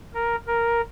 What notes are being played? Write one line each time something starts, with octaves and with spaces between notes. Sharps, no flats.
A#4
A#4